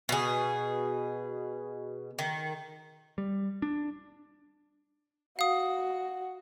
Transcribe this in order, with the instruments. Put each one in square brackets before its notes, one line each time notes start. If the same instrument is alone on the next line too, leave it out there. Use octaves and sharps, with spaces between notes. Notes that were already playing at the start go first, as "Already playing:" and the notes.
[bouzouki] B2 G#4
D#3
[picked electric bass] G3
D4
[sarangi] F#4 [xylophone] F5 D#6